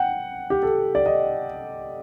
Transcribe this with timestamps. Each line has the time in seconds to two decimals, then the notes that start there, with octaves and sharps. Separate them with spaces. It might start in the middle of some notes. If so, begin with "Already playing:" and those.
Already playing: F#5 G5
0.50 G4
0.63 A4
0.95 D5
1.06 D#5